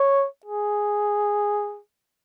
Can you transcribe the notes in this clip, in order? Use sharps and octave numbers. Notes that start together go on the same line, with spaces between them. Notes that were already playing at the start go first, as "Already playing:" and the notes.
Already playing: C#5
G#4